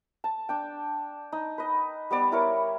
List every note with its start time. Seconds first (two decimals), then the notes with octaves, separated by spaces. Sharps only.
0.24 A5
0.49 D4 G5
1.32 D#4
1.58 B4 D#5
2.10 G3 B3 D5
2.32 E4 A#4 C#5